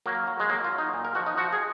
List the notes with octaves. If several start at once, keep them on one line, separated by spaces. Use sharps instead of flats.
F#3 A#3
F#3
G#3
F#3 A#3
F4
F#3
D#4
A#2
A#4
F3 F#4
D#4
F3 F#4
G#4